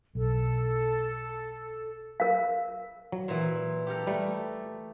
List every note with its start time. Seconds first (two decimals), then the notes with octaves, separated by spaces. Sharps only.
0.15 B1 A4
2.20 A#4 F5
3.12 F#3
3.28 A#2 E3
3.87 G4 A4 A#4
4.07 G3 A3